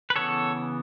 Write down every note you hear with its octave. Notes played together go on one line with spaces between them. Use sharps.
B4
C#3 E3 B3 A4 C#5